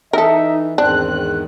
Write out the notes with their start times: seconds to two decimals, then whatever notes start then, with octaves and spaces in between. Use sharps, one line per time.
0.13 E3 D#4 A4 A#4 E5
0.78 E2 G#2 D#3 C4 D4 F#6